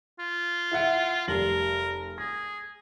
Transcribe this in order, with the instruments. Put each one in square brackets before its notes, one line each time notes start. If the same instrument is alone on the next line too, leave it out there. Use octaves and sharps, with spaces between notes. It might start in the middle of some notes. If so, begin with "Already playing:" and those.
[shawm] F4
[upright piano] E4 E5 F#5
[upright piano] F1 G3 F#7 [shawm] A#4
[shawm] G#4 [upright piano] A#6